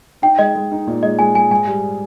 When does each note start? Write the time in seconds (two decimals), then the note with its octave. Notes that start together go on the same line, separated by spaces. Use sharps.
0.22 D#4 G5
0.38 G#3 D#5
0.55 G#3
0.72 D#4
0.87 A#2
1.03 G#3 D#5
1.19 G#3 G#5
1.35 G#3 G#5
1.51 G#2 G#5
1.67 G3